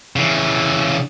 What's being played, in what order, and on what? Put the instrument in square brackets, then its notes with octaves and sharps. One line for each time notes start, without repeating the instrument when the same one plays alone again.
[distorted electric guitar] C#3 E3